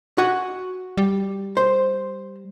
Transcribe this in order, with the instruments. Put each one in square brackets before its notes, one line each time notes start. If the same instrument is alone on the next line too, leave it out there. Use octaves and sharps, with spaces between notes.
[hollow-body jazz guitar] F#4 F#5 G#5
[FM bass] G3
[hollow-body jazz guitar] C5